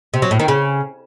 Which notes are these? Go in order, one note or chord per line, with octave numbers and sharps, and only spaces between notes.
C3
F#3
A2
D#3
C#3